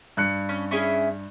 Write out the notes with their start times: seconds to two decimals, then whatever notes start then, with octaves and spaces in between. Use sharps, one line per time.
0.17 G2 F#6 C#7
0.49 C#4
0.71 C#4 E4 G#4